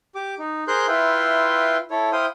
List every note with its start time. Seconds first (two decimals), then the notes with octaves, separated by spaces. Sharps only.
0.15 G4 D6
0.39 D#4
0.68 G#4 A#4 C5 C6 F#6 G6
0.88 E4 F4 B4 E5 G5 C6
1.91 E4 A4 C#5
2.12 E4 C5 F5 G5 D#6